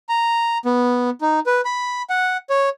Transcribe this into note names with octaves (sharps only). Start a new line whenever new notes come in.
A#5
B3
D#4
B4
B5
F#5
C#5